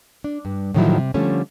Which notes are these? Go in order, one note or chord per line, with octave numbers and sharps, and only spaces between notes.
D4
G2
A2 D3 D#3 F3 F#3 E4
C3
D3 F3 G3 A3 C#4